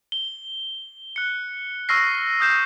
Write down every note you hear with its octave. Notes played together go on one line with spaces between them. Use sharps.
G7
F#6 C#7
C#6 E6 F6 A#6 C7
D#6 F6 G6 C7 E7